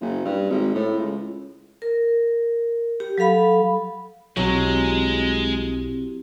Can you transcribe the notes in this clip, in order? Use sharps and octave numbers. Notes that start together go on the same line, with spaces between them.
F#1
G2
G#1
A2
C#2
A#4
G4
F#3 A4 F5 B5
B1 F#3 G#3 C4 E4 G4